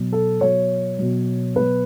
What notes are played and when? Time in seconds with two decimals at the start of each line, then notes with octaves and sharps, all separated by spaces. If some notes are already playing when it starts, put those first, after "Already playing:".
Already playing: B2 F#3
0.12 A4
0.41 B2 F#3 C#5
0.99 B2 F#3
1.56 B2 F#3 B4